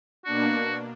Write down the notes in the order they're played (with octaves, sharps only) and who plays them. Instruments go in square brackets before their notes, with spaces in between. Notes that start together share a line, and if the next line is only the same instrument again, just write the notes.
[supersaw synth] B2 A#3 D4 [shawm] F#4